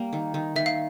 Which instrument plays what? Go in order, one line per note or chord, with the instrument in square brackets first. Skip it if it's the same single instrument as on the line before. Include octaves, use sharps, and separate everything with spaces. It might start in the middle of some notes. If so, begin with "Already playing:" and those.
Already playing: [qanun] G3 A#3
D#3
D#3
[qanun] D#3 [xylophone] E5
[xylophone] F5